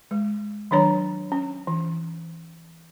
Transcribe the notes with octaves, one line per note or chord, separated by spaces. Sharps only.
G#3
D#3 F#3 D4 C#5 A#5
C#4
E3